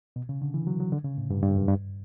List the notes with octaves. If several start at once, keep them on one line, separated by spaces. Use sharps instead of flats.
B2
C#3
D3
E3
F#3
F#3
D3
C#3
A2
G2
G2
F#2
G2